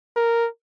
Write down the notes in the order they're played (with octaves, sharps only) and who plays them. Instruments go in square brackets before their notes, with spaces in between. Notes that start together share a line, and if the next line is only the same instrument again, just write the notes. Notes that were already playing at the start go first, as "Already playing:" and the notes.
[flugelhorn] A#4